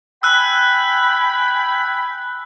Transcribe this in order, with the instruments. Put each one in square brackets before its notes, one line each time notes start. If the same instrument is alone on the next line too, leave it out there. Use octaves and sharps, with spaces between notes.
[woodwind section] G5 G#5 B5 [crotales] E6 F#6